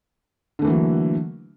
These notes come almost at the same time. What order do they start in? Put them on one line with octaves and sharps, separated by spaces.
D3 A3 E3 A#3 F#3